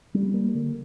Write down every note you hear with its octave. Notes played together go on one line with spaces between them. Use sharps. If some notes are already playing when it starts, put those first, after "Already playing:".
G3
A#3
D3